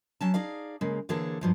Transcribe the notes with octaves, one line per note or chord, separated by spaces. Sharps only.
F#3 C#4 A5
D#4 G#4 D5 F5
C#3 G#3 A#3
D3 E3 A#3 G#4 A4 C#5
G2 F3 F#3